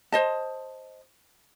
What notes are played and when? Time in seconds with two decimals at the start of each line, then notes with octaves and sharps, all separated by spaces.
0.12 C5 D#5 A5